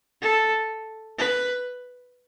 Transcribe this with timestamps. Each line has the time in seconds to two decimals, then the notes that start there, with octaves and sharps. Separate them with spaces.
0.22 A4
1.19 B4